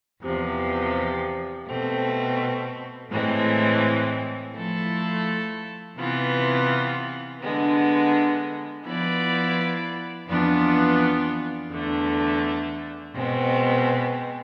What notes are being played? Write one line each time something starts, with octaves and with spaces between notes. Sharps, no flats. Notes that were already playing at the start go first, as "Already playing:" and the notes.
E2 C3 F3
B2 A3 C4
A2 E3 G#3 C4
F3 A3 E4 A4
C3 E3 B3 F4
D3 G#3 B3
F3 B3 E4 B4 D5
F2 E3 B3 D4 F4
E2 D3 A3
B2 G#3 C4